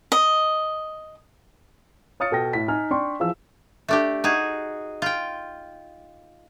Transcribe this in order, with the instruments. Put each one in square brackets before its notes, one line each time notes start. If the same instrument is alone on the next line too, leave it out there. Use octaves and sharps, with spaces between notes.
[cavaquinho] D#5
[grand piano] C#5 F5 D#6 F6 A6 C#7
B2 A4 G5 A#6
A2 B6
D#4 G#5 F6
D4 D5 G5 C6 C#6
E3 F3 G#4 F5 E6
[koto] A3 D4 G4
D#4 F#4 G#4
F4 G5